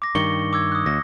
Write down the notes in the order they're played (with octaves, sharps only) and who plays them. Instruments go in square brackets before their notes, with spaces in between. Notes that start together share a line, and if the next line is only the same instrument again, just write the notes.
[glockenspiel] D6 A#6
[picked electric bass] G2 D#3 [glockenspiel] C#6 C#7 G7
[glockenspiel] D6 E6 G#6
D#6 F#6
[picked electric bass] D2 [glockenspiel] A#6